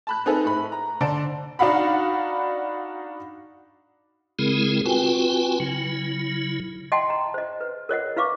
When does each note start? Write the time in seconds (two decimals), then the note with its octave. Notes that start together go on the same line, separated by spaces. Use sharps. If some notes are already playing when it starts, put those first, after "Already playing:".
0.07 A5 B5 F#6
0.26 C4 D#4 G#4 A4 B4
0.45 A2 B5
0.72 A#5
1.01 D3 C5 D5 A5 D7
1.59 D4 D#4 F#4 F5 F#5 B5
4.39 C#3 G#3 C4 E4 G#4 A#4
4.86 C4 F4 F#4 B4 G5 G#5
5.60 C#3 F#3 E4
6.92 D#5 F#5 G5 A5 C6
7.10 A#5
7.34 C5 D#5
7.61 B4
7.89 A#4 C#5 D#5 F#5
8.17 E4 B4 F5 C#6 D6